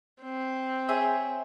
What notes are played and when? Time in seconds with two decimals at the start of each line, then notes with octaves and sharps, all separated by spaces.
0.22 C4
0.89 G#4 C#5 E5